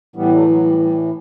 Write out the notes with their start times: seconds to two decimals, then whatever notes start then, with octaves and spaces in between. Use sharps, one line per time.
0.16 A2 E3 G3 B3
0.31 F#3 A3
0.47 F#3
0.63 G3
0.79 G3